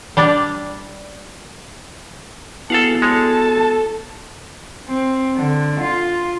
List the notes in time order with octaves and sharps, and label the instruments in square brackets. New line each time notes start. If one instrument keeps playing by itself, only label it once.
[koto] G3 D4 D5
[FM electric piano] B3 E4 F#4 [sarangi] G#4 [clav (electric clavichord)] A4 F5 F#5 [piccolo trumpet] A5
[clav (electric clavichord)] G#3 C#5 [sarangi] A4
[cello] C4
D3
F4